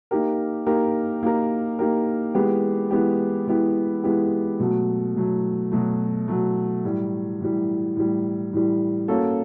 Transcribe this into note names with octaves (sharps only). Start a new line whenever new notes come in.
A#3 D#4 G4 A#4
A#3 D#4 G4 A#4
A#3 D#4 G4 A#4
A#3 D#4 G4 A#4
E3 G#3 B3 E4 G4
E3 G#3 B3 E4 G4
E3 G#3 B3 E4 G4
E3 G#3 B3 E4 G4
B2 F#3 A3
B2 F#3 A3
B2 F#3 A3
B2 F#3 A3
A2 E3 G3
A2 E3 G3
A2 E3 G3
A2 E3 G3
A#3 C#4 F#4 A4